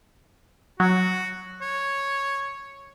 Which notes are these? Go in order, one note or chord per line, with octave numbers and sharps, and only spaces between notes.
F#3 F#4
C#5